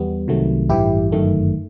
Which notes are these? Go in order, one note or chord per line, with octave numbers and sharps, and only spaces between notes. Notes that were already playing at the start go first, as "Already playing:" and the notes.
Already playing: E2 G3 B3
C2 C3 D#3 F#3 A3
A1 G2 E3 E4 G4
G1 F#2 D#3 A3